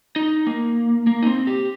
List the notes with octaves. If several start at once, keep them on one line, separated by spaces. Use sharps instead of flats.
D#4
A#3
A#3
D#4
C4
G4